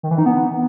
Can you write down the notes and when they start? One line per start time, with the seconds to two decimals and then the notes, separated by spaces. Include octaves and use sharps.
0.03 D#3
0.11 E3
0.18 D#4
0.26 B3